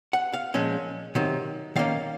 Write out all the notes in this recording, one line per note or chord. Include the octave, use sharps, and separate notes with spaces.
F#5
F5
A#2 F3 G#3 C#4
C3 D#3 F#3
D#3 F#3 A#3 C#4 F5